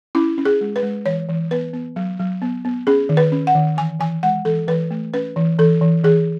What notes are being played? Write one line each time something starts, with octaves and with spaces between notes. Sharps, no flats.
C#4 E4
C#4
G#4
G#3
B4
G#3
E3 C#5
E3
B3 B4
B3
F#3
F#3
B3
B3
C#4 G#4
D#3
B4
C#4
F#5
D#3
E3 G#5
E3 G#5
G#3 F#5
E3 A4
E3 B4
A3
C#4 B4
E3
E3 A4
E3
E3 G#4